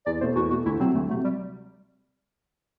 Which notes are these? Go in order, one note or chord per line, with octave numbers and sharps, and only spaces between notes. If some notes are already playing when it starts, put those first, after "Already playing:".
E2 D5
B2 A3 C5
E2 F#4
B2 A3 F#4
D2 E4
C3 F#3 C4
D2 A3
C3 F#3 A3
G3